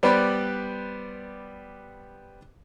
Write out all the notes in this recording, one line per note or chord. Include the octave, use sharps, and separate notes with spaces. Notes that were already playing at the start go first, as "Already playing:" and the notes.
G3 B3 B4 C5 D5 B5